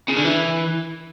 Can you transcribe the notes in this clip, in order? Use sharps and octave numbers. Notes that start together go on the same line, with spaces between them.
C#3
D3
E3